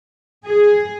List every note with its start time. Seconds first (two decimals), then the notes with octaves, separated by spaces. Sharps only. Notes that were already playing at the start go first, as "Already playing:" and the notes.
0.46 G#4